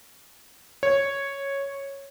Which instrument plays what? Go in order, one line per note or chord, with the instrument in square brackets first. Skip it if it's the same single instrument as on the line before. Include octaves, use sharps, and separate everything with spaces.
[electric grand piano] C#5